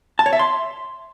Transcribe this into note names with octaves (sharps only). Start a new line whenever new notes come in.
A5
C#5
E5
C6